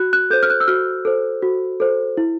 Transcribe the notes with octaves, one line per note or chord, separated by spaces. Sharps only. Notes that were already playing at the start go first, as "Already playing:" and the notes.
Already playing: F#4 F#6
F#6
A4 C5 G6
F6
F#6
E6
F#4 F6
A4 C5
F#4
A4 C5
E4